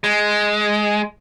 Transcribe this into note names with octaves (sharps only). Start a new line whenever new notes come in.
G#3